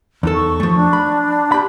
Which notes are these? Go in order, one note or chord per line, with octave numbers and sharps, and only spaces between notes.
E2 D#4 A4
C#6
F3 A3
D4
B5
G4 B5